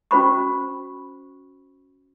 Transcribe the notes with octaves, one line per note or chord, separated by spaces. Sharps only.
C#4 F#4 C5 B5 C#6